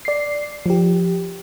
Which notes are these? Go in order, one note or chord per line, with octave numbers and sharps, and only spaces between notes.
D5 C7
F3 G4